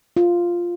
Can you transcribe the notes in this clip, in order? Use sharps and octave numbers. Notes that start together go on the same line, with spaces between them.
F4